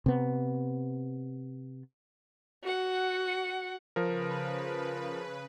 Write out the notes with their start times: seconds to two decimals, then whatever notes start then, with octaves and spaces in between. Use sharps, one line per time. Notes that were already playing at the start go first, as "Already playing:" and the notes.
0.06 C3 B3
2.63 F#4 F#5
3.96 C#3 F3 A#4 B4